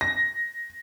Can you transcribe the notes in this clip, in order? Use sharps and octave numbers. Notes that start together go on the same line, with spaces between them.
A#6